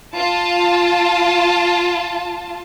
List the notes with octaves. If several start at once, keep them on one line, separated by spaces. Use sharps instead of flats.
F4 A5